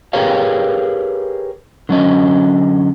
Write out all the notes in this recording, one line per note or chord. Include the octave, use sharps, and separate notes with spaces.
G4 G#4 A#4 B4 C#5 F5
D3 F#3 C#4 D#5